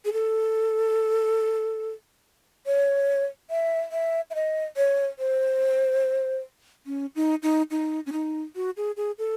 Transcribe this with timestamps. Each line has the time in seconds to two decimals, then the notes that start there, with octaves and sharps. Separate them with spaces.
0.05 G#4
0.13 A4
2.66 C#5
3.50 E5
3.92 E5
4.30 E5
4.35 D#5
4.77 C#5
5.19 C5
6.86 C#4
7.15 D#4
7.42 D#4
7.71 D#4
8.06 C#4
8.12 D#4
8.56 F#4
8.77 G#4
8.97 G#4
9.18 A4